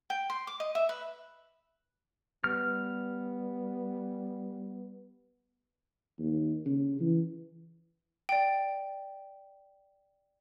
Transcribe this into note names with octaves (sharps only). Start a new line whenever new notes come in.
G5
C6
D6
D#5
E5
B4
G3 B3 F6
D#2
C#3
E3
D5 G5